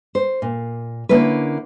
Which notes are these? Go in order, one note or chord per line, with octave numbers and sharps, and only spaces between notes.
C5
A#2
D3 A#3 C#4 E4 B4